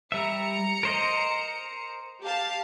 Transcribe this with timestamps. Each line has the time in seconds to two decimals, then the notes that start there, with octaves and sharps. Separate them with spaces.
0.12 G3 E5 A#5 C#7
0.83 A#4 C5 D#5
2.22 G4 F5 A5